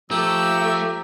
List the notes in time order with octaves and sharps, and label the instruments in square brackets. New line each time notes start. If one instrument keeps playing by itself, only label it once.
[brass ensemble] F3 A#5 [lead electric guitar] A3 [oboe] G4 [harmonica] E6